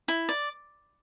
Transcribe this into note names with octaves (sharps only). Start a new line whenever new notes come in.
E4
D5